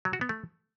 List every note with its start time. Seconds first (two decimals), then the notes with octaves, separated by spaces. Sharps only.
0.05 F#3
0.13 F#4
0.21 B3
0.29 A3